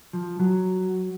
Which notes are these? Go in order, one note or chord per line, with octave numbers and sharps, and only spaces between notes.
F3
F#3